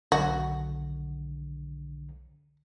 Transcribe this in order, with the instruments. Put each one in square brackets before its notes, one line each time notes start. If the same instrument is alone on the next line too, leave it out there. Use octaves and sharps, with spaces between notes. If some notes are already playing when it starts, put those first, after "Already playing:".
[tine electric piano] B1 D3 [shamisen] F#4